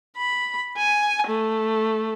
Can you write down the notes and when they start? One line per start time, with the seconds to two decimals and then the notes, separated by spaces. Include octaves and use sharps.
0.17 B5
0.77 G#5
1.27 A3